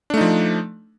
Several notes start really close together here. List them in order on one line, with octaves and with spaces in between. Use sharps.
D4 A3 D#4 F3